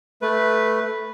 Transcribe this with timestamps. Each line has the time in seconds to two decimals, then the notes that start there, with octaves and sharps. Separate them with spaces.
0.22 A3 B4